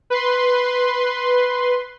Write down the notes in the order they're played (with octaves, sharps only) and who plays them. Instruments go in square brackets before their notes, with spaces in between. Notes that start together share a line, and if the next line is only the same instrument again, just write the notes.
[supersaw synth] B4 C6